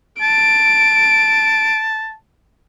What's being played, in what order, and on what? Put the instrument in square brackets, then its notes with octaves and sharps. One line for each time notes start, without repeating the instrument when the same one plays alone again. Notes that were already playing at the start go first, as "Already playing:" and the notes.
[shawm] A5 [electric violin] D7